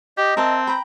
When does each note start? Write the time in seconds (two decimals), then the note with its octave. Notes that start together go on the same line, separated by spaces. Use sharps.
0.17 G4 D#5
0.37 C4 A#4 E5 A5
0.67 G5 A#5 B5